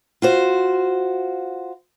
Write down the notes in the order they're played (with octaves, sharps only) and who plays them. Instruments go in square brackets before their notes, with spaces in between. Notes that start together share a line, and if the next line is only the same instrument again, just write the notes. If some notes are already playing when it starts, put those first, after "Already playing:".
[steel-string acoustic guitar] F4 F#4 C5